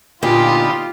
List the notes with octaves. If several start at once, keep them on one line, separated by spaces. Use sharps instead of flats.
A#2 D3 B3 D#4 F4 G4